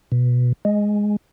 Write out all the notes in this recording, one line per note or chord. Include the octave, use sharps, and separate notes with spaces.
B2
G#3